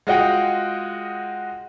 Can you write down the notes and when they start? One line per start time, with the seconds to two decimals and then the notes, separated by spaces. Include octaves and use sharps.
0.07 G#3 F4 F#4 D#5 F#5 G5